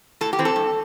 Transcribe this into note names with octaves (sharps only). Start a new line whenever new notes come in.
A2 A4
G4
E3 C4
A4
G2